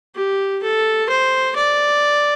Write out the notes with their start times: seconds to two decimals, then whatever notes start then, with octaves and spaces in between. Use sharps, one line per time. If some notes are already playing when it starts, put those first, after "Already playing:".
0.16 G4
0.63 A4
1.09 C5
1.56 D5